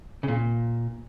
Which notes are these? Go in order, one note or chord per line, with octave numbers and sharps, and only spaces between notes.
C#3
A#2